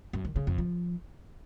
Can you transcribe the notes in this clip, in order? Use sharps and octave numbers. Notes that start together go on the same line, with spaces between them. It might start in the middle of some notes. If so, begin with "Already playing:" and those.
F#2
D#3
C#3
F2
F3